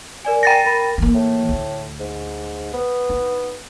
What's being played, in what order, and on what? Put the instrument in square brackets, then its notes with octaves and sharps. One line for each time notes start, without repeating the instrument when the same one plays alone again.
[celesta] A#4 D5 G#5
[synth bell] G5 A6 A#6
[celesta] A#4 B5
[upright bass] E3 A#3
[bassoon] A2
[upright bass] D2
[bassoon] G#2
B3
[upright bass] D#4